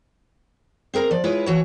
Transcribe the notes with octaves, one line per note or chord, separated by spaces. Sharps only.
C4 G#4 A#4 A#5
F3 D5
G#3 E4 F4 B4 C#5
E3 F#4 C#5